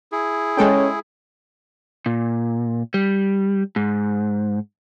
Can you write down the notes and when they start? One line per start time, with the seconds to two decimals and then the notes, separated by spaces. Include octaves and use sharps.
0.12 E4 G#4
0.57 G#3 C#4 A4 G5
2.06 A#2
2.94 G3
3.76 G#2